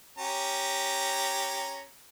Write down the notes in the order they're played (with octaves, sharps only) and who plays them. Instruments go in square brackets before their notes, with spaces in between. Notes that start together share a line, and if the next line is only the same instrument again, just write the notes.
[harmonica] C#4 G4 A#5